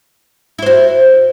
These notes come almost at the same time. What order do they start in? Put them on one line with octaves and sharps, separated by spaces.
E4 C5 F#4